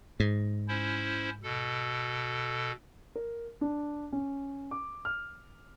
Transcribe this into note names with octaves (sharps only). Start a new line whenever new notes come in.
G#2
C#4 E4 C5
B2 A4
A#4
D4
C#4
D6
F6